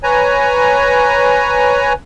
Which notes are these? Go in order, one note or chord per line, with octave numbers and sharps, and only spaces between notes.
B4 C#5 G#5 A#5